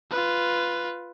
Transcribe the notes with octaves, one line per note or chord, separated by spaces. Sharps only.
F4 B4